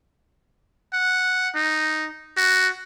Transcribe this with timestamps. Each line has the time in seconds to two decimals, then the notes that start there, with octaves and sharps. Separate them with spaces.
0.93 F#5
1.55 D#4
2.37 F#4